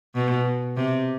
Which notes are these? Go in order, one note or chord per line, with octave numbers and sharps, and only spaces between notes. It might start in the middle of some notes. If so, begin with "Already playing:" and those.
B2
C3